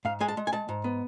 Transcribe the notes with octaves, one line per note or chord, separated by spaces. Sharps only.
G#2 F5
G#3 G#5
A5
G#3
G#5
G#3 A5
G#2
B3